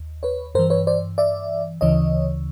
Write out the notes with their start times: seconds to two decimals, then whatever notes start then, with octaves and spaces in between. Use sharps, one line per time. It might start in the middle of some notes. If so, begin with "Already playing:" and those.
Already playing: D#2
0.23 B4 C#5
0.55 G2 E3 A#4 C5
0.70 B4 C#5
0.87 C5 D5
1.18 D5 E5
1.81 D2 C#3 E3 C#5 D#5